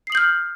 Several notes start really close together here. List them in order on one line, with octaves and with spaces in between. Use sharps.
C7 D#6 F#7 G6 F6